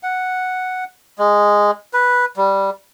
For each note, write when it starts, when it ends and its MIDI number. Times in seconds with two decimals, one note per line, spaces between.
0.03 0.84 78
1.19 1.71 56
1.93 2.25 71
2.37 2.70 55